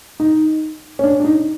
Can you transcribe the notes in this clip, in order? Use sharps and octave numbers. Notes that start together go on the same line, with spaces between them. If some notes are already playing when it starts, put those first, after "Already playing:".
D#4
C#4
D4
D4
D#4